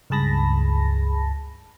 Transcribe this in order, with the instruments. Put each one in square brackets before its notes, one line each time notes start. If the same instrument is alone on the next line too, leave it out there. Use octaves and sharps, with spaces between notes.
[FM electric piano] C#2 G2 G#4 A5 B5 A#6